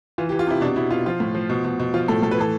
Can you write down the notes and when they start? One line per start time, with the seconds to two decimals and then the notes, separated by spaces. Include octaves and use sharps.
0.18 E3 F4
0.29 G4
0.32 E3
0.39 F4
0.47 C3 E4
0.61 B2 D4
0.76 B2 E4
0.90 B2 F4
1.06 F3 F4
1.20 A2
1.35 F3
1.50 B2
1.64 B2
1.80 B2
1.94 F3 F4
2.08 A2 A4
2.22 A2 A4
2.31 B4
2.38 E3 A4